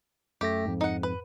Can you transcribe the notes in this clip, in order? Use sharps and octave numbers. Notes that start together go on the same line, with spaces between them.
F#2 A3 G4 A#6
F2 G#2
D#4 F#5
B4